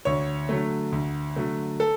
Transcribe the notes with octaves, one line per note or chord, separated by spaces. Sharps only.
D2 C#5
D3 F#3 A3
D2
D3 F#3 A3
A4